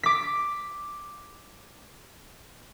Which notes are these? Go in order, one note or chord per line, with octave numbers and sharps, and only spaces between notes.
D6 B6